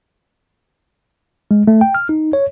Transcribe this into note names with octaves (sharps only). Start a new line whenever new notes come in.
G#3
A3
G5
F6
D#4
C#5